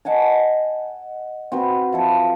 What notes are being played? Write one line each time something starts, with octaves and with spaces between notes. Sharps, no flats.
D#5 F#5 G#5 A5
C4 F#4 B4
F3 E4 A4